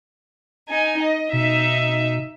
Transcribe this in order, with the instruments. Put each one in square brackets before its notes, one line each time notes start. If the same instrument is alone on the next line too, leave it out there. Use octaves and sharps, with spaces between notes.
[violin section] D#4 G#5
D#5
[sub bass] B2 [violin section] D#4 E5